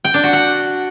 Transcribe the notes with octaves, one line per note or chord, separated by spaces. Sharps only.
G5
D4
F#4
F#5